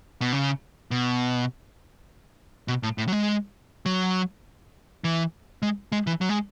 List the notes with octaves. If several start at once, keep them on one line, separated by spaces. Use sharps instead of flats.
B2
C#3
B2
B2
A2
A2
F#3
G#3
F#3
E3
G#3
G#3
E3
F#3
G#3